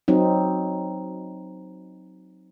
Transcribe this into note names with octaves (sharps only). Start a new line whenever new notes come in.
F#3 C4 D#4